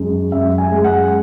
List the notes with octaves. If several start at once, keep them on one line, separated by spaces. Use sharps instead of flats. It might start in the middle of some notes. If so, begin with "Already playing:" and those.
Already playing: F#2 G#3
F#2 E5
G#5
G#3
F#5